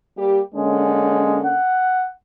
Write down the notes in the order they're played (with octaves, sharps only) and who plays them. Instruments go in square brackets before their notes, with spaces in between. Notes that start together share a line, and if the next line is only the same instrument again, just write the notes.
[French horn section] G3 A#3 G4
[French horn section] D3 A#3 C#4 [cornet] G#3
[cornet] F#5